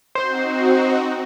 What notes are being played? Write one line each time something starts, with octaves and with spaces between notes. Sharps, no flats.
C4 D#4 F#4 C5